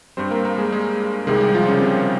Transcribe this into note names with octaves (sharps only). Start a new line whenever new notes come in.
G2 G3 C4 C5
A#3 A#4
A#3 A#4
G#3 G#4
G#3 G#4
C2 C3 D#3 G#3 G#4
G3 G4
F3 F4
C#3 C#4
C3 C4